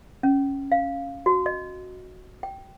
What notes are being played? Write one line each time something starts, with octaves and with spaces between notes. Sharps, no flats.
C#4
F5
F#4
D#5
G5